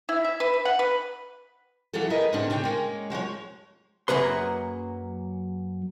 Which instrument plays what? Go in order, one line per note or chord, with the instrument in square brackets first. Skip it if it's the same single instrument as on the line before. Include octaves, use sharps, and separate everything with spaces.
[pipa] E4
E5
B4
B4
F#5
B4
[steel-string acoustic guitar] E3 F#3 F4 G#4 A4
G#4 A#4 B4 D#5
G#2 D3 C#4 D4 G4
C#3 D4 C#5 G5
G#3 A#3 C#4
F3 F#3 G#3 C#5
[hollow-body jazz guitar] F#2 F#3 A#3 G#4 B4 C6